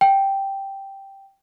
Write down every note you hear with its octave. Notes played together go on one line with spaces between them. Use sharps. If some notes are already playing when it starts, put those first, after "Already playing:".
G5